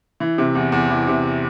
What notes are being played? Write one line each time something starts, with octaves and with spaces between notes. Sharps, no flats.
E3
C3
E2
E2
E3
C3